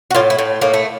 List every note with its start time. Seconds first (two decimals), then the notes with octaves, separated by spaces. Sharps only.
0.11 F#4
0.15 A2 F4
0.30 E4
0.38 A2
0.61 A2 A#3
0.74 A3